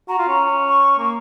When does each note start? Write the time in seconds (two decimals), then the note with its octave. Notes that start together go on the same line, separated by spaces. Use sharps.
0.08 F#4 A#5
0.18 F4
0.28 C#4
0.69 C#6
0.98 A#3